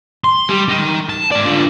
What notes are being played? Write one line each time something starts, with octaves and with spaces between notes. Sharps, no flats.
C6
G3
D#4 G5
A5
G#2 D5
D3 F4